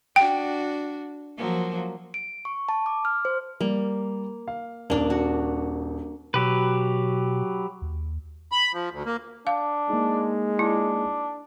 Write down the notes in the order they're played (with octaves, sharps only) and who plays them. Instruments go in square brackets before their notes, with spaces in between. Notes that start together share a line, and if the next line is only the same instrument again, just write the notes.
[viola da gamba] D4 F#4 [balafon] G5
[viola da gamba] F3 F#3 A#3
[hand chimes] D7
C#6
A5
D6
F6
C5
[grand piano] G3 [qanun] A#3
[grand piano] F5
[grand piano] D#1 [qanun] A#3 D4
[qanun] F#4
[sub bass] B2 [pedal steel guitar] F#3 G4 B4
[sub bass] D#2
[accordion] B5
F3
D2
A#3
[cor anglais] D4 [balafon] F5
[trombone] G#3 [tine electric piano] A#3 D#4
[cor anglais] D4 [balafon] E4